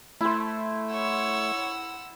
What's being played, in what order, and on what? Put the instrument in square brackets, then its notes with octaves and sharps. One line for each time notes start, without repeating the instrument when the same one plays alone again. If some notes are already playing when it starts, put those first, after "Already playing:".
[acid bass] A3 [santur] E4 C5
[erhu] C#5 [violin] F#5 E6